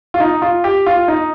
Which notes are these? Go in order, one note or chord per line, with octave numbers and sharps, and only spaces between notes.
F4
D#4
F4
G4
F4
D#4